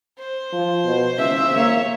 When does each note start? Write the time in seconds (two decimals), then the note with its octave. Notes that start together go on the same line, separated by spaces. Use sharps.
0.19 C5
0.53 F3
0.85 B2
1.18 C#3 E5
1.56 A#3 C#5